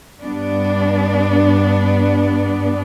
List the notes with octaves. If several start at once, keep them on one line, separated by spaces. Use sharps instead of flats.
G2 B3 D4